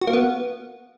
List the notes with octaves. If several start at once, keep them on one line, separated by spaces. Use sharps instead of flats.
F#4
A#3
B3